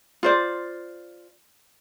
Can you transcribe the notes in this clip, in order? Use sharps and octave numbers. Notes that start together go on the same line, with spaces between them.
F4 C5 D5